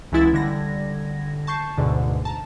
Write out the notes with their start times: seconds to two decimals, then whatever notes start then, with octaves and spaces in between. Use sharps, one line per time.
0.12 C#2 E3 F#3 G#3 E4 A6
0.33 D3 G3 G#6 A#6
1.47 A5 C#6 G6 C7
1.77 D2 G#2 B2 D3
2.25 A5 A#5